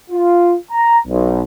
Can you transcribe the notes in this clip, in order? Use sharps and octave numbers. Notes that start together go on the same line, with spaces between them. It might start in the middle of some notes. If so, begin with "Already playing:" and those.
F4
A#5
B1